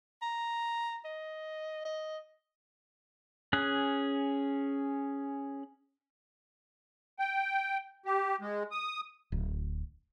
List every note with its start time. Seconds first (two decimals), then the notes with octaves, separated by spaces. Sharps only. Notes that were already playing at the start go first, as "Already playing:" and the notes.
0.22 A#5
1.05 D#5
1.85 D#5
3.53 C#4 G#4 F#6
7.19 G5
8.06 G4
8.41 G#3
8.71 D#6
9.32 D1